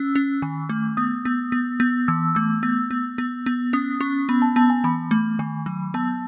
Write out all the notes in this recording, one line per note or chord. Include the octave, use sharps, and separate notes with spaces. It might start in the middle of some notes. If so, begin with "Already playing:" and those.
Already playing: C#4 E6
C#4
D#3
A3
B3 D#6
B3
B3
B3
E3 E6
A3 E6
B3 E6
B3
B3
B3
C#4 D#6
C#4 C#6
B3 B5
A5
B3 A5
G#5
E3 B5
A3
D#3
F#3
B3 A5